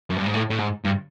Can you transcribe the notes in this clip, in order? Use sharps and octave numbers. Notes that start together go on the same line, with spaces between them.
F#2
G2
G#2
A2
A2
G#2
G2